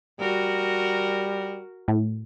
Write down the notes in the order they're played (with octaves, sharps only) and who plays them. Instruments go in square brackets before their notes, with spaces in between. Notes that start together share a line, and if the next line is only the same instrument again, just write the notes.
[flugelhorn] G3 [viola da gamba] F#4 A#4
[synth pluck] A2